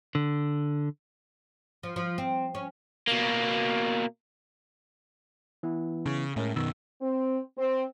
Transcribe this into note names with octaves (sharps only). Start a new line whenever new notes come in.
D3
F3
F3
C4
C#4
B2 A#3
E3 B3 E4
C#3
A2 G#3 C#4 A#4
F#2 B2 D#3 E6
C4
C4